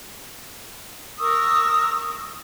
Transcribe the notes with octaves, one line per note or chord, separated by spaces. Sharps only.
A#4 C#6 D#6 E6